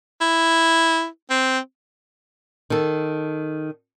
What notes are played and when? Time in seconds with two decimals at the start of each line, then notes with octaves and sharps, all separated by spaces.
0.21 E4
1.30 C4
2.70 D#3 A4